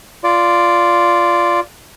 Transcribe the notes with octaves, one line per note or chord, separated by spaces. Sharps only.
F4 D5